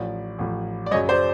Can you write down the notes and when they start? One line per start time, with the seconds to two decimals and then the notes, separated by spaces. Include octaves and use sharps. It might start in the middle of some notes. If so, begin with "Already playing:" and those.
Already playing: A1 A2 F3 D5
0.39 A1 A2 F3
0.86 D5
0.91 F#2 C#3 F#3 C#5 D#5
1.09 C5 D5